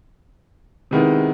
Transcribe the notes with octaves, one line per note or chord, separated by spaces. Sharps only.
C3 D#3 G#3 B3 E4